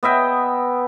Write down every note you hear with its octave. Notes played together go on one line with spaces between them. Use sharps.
B3 D#5 E5 G5